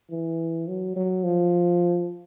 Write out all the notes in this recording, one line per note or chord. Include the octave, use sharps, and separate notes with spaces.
E3
F#3
F#3
F3